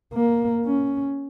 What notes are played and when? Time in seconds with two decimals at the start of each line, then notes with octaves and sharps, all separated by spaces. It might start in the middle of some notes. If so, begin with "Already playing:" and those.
0.14 A#3
0.66 C#4